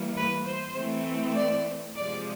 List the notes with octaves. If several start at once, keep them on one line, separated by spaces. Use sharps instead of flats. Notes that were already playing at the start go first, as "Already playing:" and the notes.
Already playing: E3 G3 A#3
B4
C5
E3 A3 C4
D5
C3 F3 G#3 D5